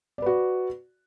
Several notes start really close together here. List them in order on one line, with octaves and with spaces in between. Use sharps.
D5 B4 F#4